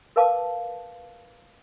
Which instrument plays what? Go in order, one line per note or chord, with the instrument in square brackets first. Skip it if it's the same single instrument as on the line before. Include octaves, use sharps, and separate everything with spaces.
[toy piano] A#4 B4 F5 A5 D6